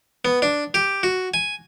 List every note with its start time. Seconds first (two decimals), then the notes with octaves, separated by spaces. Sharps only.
0.25 B3
0.42 D4
0.74 G4
1.03 F#4
1.34 G#5